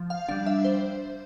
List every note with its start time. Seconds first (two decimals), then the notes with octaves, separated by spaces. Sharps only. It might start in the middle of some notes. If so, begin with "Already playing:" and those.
Already playing: F3
0.10 F5
0.28 G3 D4 F5
0.46 E5
0.64 C5